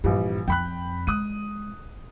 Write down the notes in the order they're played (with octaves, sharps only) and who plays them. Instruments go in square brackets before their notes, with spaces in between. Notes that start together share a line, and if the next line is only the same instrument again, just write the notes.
[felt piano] A#1 E3 G3 [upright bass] G2
[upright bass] F2 [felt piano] G5 B5 F#6
[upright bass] G#3 [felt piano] D#6 F#6 D#7